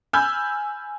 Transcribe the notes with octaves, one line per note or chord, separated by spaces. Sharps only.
G#5 B5 E6 F6 G6 G#6